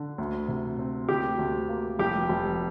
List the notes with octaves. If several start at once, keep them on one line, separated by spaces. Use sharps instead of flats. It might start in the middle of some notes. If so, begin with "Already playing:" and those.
Already playing: D3
D2
C3
C4
D2 G4
D2
A#3
F1 G4
F1